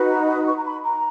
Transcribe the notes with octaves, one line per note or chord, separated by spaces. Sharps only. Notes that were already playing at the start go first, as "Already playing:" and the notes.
Already playing: D#4 F#4 B4
A#5
D#6
C#6
A#5
B5
A#5